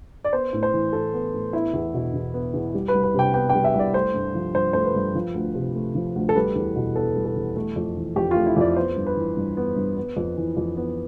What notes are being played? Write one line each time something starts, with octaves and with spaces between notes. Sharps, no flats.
D5
B3 C5
A2
C5
E3
A2 A4
B3
A2
B3 E4
E2
B2
E2
B3
E2
G3
B4
C2
B4
C3 G5
B3 G5
G5
G3
E5
C2 D5
A3 C5
G2
F3
G2 C5
A3 C5
B4
G2
F3
D2
C3
A3
F3
D2
A4
G3 B4
E2
B2
B3 A4
G3
A4
E2
A3
F2
E3
F2 G4
F4
A3
E4
F2 D5
B3 C5
G2
B4
E3
G2
B3
G2
B3
F2
E3
F2
B3